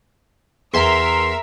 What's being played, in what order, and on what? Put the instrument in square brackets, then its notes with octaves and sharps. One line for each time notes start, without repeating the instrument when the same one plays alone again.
[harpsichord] E2 [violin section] A#4 E5 [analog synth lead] C6